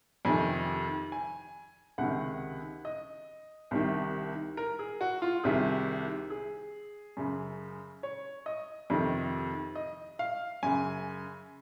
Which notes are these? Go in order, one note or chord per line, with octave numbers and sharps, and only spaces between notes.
F2 C3 D#3 G#5
G#5
C#2 C3 D#3 F#5
D#5
C2 C3 D#3
A#4
G#4
F#4
F4
C2 C3 D#3 G#4
G#4
F#2 C#3
C#5
D#5
F2 C3 D#3
D#5
F5
F#2 C#3 G#5